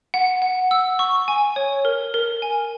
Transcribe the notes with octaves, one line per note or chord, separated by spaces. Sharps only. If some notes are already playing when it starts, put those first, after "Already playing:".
F#5
F#5
E6
C#6
G#5
C#5
A#4
A#4
G#5